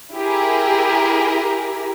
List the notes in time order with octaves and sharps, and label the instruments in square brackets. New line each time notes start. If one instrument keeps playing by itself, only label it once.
[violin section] E4 G4 G#4 A#4